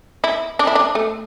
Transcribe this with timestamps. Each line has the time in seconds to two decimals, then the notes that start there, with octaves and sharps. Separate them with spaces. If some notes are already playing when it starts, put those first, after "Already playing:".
0.24 E4
0.59 D4
0.67 E4
0.75 D4
0.95 A3